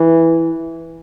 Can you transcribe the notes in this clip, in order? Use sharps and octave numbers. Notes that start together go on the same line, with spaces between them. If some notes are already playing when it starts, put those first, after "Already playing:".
Already playing: E3